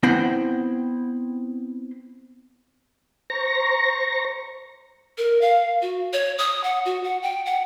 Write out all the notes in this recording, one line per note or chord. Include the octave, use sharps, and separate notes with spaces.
B3 C4 E4 C5 F#5 G5
C5 A#5 C#6 A#6
A#4
F5
F#4
C#5
D#6
F#5
F#4
F#5
G5
F#5